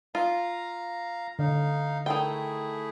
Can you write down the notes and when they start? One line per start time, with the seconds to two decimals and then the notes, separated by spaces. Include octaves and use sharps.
0.15 F4 F5 A#5
1.39 D3 D#4 F5
2.06 D#3 A3 E4 G#4 G5